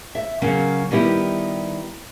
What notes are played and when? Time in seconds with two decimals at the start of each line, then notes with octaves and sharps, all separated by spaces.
0.15 E5
0.42 C#3 F#3 A#3 C#4
0.91 D#3 G3 B3 E4 G4